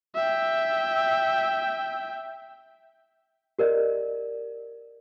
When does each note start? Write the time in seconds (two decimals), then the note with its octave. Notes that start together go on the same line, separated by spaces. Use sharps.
0.15 E5 G5
3.59 G4 A#4 D5 D#5